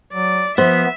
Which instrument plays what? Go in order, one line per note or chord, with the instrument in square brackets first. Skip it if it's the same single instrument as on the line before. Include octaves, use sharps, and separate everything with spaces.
[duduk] F#3 [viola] D5
[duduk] F3 [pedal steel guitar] B3 [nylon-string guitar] C5 [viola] E5